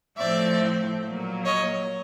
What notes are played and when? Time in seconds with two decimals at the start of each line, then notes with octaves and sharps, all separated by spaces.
0.17 A2 F3 A3 C4 D5 E5
1.03 A#2 F#3 A#3
1.45 C#5 D#5